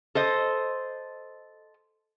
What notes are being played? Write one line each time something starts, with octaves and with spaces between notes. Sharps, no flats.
A4 C5 D#5